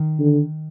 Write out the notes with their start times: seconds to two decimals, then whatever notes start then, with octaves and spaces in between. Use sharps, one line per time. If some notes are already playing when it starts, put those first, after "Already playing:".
Already playing: D#3
0.19 D3